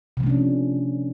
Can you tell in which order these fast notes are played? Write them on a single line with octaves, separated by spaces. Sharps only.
C3 F3 A3 D4 C#4